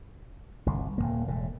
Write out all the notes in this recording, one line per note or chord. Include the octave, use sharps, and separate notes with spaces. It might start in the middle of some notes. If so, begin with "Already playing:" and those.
G1 C2
D#1 E2 A#3
E1 A2